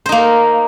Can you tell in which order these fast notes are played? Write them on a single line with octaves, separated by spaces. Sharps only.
C5 D#4 A#3